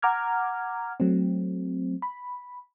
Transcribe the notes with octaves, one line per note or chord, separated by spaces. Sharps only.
F#5 A#5 D6 F6 G#6
F#3 A3 C4
B5